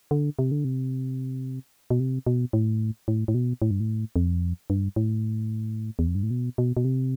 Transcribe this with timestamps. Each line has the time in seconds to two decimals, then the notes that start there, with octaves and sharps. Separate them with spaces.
0.11 D3
0.39 C3
0.51 D3
0.65 C3
1.90 B2
2.00 C3
2.27 B2
2.53 A2
3.08 A2
3.28 A2
3.34 B2
3.62 A2
3.71 G2
3.80 A2
4.16 F2
4.70 G2
4.96 A2
5.99 E2
6.07 F2
6.15 G2
6.23 A2
6.31 B2
6.58 B2
6.77 B2
6.85 C3